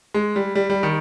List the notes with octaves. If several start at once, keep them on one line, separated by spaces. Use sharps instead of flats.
G#3
G3
G3
G3
D#3